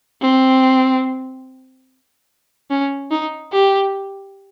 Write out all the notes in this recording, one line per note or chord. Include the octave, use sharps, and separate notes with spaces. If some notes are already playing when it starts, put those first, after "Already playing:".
C4
C#4
D#4
G4